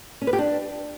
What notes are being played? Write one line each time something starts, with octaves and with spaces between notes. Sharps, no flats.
C#4
B4
G4
D4